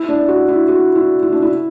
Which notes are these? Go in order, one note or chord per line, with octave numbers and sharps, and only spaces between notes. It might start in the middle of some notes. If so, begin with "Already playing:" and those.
Already playing: E4
D4
F#4
E4
F#4
E4
E4
D4
E4